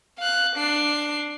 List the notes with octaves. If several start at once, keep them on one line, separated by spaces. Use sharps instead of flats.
F5 F#6
D4 C7